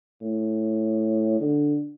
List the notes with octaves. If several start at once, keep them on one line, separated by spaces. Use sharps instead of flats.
A2
D3